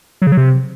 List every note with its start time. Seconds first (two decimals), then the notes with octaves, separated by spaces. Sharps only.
0.22 F#3
0.27 C#3
0.32 F#3
0.37 C3